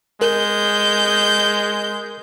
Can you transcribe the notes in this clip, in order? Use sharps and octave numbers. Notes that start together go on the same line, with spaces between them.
G#3 A#4 G6